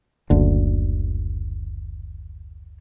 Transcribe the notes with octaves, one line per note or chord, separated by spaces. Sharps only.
F#1 D2 D3